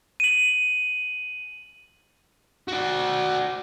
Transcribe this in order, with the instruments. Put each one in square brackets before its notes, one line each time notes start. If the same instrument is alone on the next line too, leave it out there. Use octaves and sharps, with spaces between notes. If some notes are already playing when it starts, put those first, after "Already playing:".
[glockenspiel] D#7 F#7
[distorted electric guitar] F#4 D5